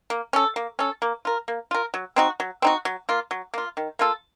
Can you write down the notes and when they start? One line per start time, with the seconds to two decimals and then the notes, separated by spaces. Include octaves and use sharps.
0.10 A#3
0.33 C#4 A4
0.56 A#3
0.79 C#4 A4
1.02 A#3
1.25 F4 A#4
1.48 A#3
1.71 F4 A#4
1.94 F#3
2.16 C4 D#4 F#4
2.40 F#3
2.62 C4 D#4 F#4
2.85 F#3
3.09 A#3 F4
3.31 F#3
3.54 A#3 F4
3.77 D#3
3.99 A#3 F4 A4